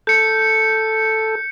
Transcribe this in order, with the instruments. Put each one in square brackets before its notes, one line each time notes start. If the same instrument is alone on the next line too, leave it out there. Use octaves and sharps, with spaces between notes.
[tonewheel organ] A4 [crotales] G6 C#7